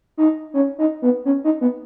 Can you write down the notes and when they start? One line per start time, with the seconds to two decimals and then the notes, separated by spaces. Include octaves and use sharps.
0.17 D#4
0.54 C#4
0.78 D#4
1.02 B3
1.25 C#4
1.44 D#4
1.61 B3